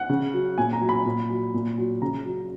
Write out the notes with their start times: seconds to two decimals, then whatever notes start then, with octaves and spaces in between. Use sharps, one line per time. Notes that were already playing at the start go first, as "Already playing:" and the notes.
Already playing: F#5
0.09 C#3
0.34 F#3
0.58 A#2 G#5
0.73 A#5
0.81 F#3
0.89 B5
1.05 A#2
1.30 F#3
1.54 A#2
1.78 F#3
2.02 C#3 A#5
2.25 F#3